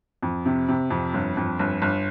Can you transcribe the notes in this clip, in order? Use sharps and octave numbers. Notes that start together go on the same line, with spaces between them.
F2
C3
C3
F2
G1
F2
G1
G1